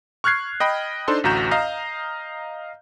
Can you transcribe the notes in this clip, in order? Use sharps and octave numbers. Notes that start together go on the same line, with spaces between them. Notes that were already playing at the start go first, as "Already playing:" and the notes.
C#6 F6 F#6 G#6 C7
D#5 G5 B5
D4 D#4 A4 C5 C6
A1 D2 F#4 A#5 G6 E7
D#5 F5 A#5